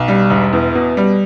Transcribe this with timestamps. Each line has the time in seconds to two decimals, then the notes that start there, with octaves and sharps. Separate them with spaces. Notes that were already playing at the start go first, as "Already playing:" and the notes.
Already playing: B1
0.08 G3
0.30 E1
0.53 E2
0.75 B2
0.97 G3